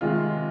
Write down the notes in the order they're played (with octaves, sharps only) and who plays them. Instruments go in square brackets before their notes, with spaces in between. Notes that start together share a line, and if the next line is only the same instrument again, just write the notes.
[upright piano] C3 D#3 G#3 F4